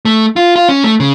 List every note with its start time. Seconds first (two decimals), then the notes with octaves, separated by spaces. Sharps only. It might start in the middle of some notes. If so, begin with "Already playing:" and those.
0.05 A3
0.36 F4
0.56 F4
0.69 C#4
0.84 A3
1.00 C#3